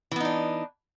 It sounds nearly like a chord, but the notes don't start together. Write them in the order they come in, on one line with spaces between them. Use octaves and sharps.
E3 B3 D#4 D4